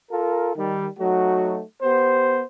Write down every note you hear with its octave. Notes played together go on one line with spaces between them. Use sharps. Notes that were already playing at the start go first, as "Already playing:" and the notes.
F4 A4 A#4
D#3 G3
F#3 A3 D#4 F#4
B3 G4 C5